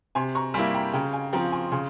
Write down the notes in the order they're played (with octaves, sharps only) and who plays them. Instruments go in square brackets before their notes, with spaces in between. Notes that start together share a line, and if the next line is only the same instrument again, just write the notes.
[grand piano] C3 [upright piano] G#5 C6
[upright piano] A#5 C#6
[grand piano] G3 [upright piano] G#5 C6
[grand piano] A#3 E4
[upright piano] G5 A#5
[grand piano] C#3 [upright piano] G5 A#5
[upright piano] F5 G#5
[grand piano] F3 C4 [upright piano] G5 A#5
[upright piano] G#5 C6
[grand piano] C#3 [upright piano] G#5 C6